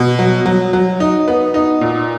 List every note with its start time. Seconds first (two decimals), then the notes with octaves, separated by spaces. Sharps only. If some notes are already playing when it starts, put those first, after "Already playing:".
Already playing: B2
0.19 F#3
0.46 F#3
0.73 F#3
1.00 D#4
1.28 B3
1.54 D#4
1.81 A#2